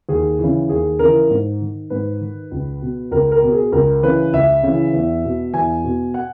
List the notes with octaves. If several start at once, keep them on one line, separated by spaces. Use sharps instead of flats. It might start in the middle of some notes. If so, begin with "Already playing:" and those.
D#2 G#4
C#3 E3
D#2 G#4
C#3 E3 A#4
G#2
D#3
G#2 B4
D#3
C#2
B2
C#2 A#4
A#4
B2
G#4
C#2 A#4
C#3 E3 B4
C#2 E5
C#3 E3
E2
B2
E2 G#5
B2
F#5